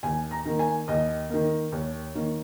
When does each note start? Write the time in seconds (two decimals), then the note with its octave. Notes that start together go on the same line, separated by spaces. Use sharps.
0.03 D#2 G#5
0.31 A#5
0.45 D#3 A#3
0.59 G#5
0.88 D#2 D#5
1.30 D#3 A#3
1.72 D#2 C#5
2.15 D#3 A#3